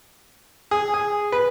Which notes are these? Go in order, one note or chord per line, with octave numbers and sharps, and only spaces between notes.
G#4
G#4
B4